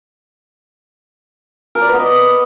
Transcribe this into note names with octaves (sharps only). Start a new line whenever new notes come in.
A#4
D5
B4
B3
D#5